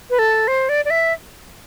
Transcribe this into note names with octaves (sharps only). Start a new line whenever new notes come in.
B4
A4
C5
D5
D5
E5